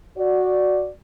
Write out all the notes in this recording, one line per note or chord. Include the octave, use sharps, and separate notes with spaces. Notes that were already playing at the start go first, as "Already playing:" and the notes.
F#4 D5